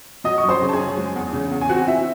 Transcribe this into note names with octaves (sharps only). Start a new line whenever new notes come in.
F#3 D#5 D#6
C#6
F#2
C5 C6
C#3
A5
G#4 G#5
F#2
G#3
E2
C#3
E2
G#5
C4 F#4 F#5
E4 E5